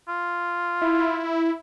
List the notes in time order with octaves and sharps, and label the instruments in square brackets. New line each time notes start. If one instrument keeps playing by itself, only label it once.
[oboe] F4
[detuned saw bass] E4